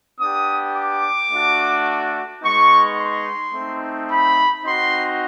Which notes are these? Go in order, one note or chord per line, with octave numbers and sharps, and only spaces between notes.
B3 D4 G4 D#6
D6
A3 D4 F#4
G#3 B3 D#4 C#6
C6
A3 C4 D#4
B5
C4 D#4 F#4 C6